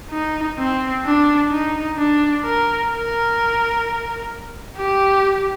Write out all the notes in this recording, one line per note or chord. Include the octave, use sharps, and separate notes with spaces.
D#4
C4
D4
D#4
D4
A#4
A#4
G4